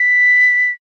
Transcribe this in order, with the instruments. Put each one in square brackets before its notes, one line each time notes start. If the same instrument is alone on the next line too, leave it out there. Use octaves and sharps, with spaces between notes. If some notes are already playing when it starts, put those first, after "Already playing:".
Already playing: [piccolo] B6